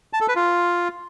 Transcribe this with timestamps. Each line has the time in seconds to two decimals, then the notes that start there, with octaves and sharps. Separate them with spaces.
0.13 A5
0.21 A4
0.28 B4
0.36 F4